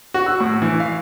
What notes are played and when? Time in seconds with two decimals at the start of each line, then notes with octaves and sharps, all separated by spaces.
0.14 F#4
0.26 E6
0.40 A2
0.62 E3
0.80 F5